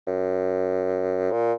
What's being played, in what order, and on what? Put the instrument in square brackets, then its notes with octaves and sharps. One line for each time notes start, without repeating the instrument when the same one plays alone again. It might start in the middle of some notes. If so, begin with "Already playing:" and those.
[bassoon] F#2
A#2